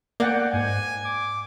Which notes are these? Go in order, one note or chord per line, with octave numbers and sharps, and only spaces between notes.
A#3 D5 F#5 G5
G#2 G#5
D6